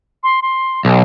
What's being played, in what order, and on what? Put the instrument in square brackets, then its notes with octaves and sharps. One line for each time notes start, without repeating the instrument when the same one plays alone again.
[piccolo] C6
C6
[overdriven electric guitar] B1